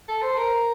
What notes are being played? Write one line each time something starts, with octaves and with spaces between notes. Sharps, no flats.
A4
C5
A#4